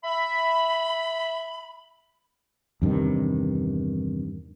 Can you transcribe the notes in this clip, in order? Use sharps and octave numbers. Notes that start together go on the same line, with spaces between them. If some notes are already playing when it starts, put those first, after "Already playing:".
E5 B5
E2 G2 C3 D#3